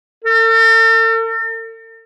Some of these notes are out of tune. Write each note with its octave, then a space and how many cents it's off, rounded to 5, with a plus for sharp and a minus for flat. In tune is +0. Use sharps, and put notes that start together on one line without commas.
A4 +45